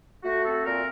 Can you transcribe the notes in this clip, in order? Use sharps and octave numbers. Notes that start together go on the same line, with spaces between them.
A3 F#4
C4 A4
A#2 A#4